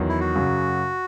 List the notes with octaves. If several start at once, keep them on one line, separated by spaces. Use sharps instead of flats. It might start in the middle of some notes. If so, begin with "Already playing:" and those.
Already playing: E2 D#3 F#3
E4
F#4
F#2 C#3 F#3